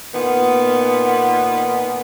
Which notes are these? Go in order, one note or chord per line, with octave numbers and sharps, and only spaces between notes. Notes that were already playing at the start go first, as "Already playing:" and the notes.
A#2 D#3 B3